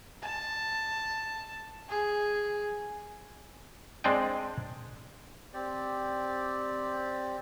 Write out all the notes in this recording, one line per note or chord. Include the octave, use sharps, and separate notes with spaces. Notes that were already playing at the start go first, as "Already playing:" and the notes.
A5
G#4
G#3 C4 D4 D5 D#5 G5
C4 G4 D5